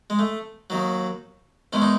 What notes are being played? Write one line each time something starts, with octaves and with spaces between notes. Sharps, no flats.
G#3
A3
D#2 D#3 F#3
E2 D#3 G#3 C#4
D#4